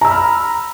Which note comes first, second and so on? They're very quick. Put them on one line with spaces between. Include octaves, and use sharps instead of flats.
A#5 E6 B5 F6